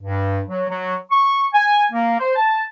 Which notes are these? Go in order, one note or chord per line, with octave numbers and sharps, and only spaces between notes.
G2
F#3
F#3
C#6
G#5
A#3
C5
A5